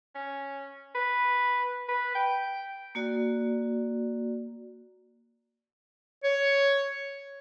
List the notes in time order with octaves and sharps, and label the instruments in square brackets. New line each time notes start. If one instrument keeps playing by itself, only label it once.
[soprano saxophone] C#4
B4
B4
G5
[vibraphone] A#3 F#4 D5
[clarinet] C#5